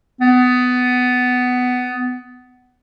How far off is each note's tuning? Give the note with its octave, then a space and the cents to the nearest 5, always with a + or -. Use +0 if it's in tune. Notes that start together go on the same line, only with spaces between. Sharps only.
B3 +15